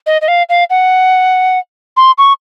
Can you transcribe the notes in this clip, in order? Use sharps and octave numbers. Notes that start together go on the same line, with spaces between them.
D#5
D#5
F5
F5
F#5
C6
C#6